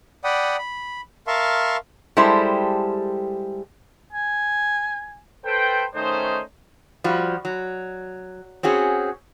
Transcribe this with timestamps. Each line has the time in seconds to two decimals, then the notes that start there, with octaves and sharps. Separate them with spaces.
0.24 D5 F#5 G5 B5 D#6
0.58 B5
1.27 A#4 E5 F5 A5 C6 C#6
2.17 G3 G#3 E4 G4 A4 C5
4.13 G#5
5.45 A4 B4 C5 G5
5.95 D#3 A3 C#4 D#4 G#4 C5
7.04 F3 G3 F#4
7.45 F#3
8.63 C4 C#4 F#4 G#4